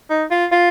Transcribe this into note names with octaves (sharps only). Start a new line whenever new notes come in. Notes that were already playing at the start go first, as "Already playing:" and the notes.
D#4
F4
F4